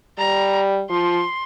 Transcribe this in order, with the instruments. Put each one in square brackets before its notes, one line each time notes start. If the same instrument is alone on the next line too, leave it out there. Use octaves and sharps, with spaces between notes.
[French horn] G3 [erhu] A#5
[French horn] F3 [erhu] C6